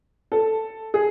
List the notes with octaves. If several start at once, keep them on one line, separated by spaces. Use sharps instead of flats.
A4
G#4